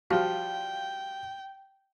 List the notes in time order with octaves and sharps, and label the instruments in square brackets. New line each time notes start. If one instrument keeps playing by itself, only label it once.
[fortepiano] F3 G3 F4 [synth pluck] F#4 [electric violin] G5